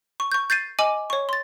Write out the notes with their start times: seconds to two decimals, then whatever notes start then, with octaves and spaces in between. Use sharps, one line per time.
0.20 C#6
0.32 C#6 G6
0.50 G6 A6 C7 D#7
0.79 D#5 G#5 D6 D#7 F#7
1.10 C#5 C#6
1.29 C6 A6